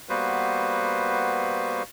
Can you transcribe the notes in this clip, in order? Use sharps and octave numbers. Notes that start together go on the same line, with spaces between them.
G3 A#3 B3 F#4 B4 C5